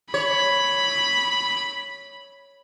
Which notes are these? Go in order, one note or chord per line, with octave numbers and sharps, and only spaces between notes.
C#5 B5